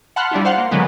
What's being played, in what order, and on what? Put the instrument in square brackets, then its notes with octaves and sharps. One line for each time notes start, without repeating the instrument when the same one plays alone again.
[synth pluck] F#5 A5 B5 C6 F6 F#6
G3 D4 E4 F4
C5 F5 F#5 C6
A#3
D3 D#3 F#3 G#3 B3